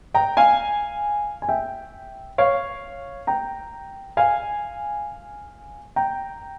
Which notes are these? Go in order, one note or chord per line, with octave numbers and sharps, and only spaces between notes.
G5 A#5
F5 G#5
G#5
E5 G5
C#5 F5
G5 A#5
F5 G#5
G5 A#5